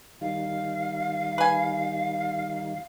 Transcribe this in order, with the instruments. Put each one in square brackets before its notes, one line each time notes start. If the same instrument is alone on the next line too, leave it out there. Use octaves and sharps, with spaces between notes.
[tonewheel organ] D#3 G3 D#4 [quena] F5
[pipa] B4 G#5